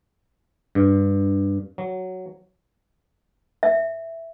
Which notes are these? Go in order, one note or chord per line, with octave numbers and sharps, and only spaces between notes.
G2
F#3
E5